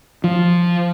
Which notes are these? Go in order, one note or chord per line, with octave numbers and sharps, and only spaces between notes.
F3